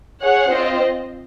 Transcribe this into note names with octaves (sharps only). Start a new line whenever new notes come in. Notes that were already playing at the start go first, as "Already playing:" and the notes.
G#4 C#5 F#5
C4 F4 C5 D#5